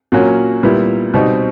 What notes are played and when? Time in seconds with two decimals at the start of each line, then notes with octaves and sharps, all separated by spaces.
0.12 A#2 F#3 A#3 C#4 F#4
0.63 A#2 G3 B3 E4
1.14 B2 G3 C4 D#4